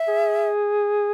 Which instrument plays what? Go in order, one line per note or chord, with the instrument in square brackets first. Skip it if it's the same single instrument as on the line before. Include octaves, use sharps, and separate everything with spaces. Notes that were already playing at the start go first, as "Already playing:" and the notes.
Already playing: [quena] E5
[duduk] G#4